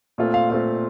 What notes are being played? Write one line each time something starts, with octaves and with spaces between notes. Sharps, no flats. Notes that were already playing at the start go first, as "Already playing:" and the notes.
A#2 A3 C4 F4
F5
A#2 A3 C4 F4 F5